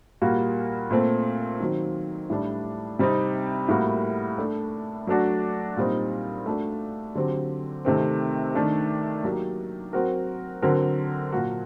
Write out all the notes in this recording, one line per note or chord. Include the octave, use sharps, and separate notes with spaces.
A#2 G3 A#3 F#4
A#2 A3 C4
D#3 F#3 C4
A2 G3 D4
C3 G3 C4 D#4
A2 G3 A#3 F#4 A#4
A3 D4 A4
F#3 A3 D4 F#4
A#2 G3 C4 D#4
A3 D4 F#4
D3 F#3 C4 G4
C3 D#3 A3 C4
D#3 A3 D4 A4
F#3 A#3 D#4 G4 A#4
F#3 C4 F#4 A#4
D3 F#3 C4 F#4 A#4
A#2 F#3 A#3 F#4